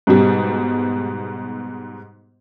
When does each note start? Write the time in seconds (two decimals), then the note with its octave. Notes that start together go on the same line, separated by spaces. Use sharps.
0.07 G#2 B2 G3